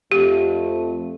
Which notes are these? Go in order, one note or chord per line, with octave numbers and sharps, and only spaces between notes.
F2 A3 G4